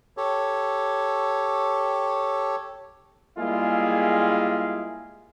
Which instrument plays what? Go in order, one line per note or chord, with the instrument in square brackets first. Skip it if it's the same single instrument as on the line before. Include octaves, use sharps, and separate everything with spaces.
[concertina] G4 A4 C#5
[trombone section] G3 G#3 A#3 E4 F4 G#4